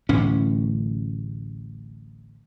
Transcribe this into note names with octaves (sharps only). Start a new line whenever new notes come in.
D1 A1 A2 C#4